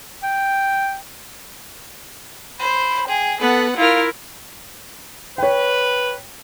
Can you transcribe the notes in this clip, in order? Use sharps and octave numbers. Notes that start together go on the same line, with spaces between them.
G5
C5 B5
G#4 G5
B3 A4 B4 F#5
E4 F4 A#4 F5 F6
B4 C#5 G5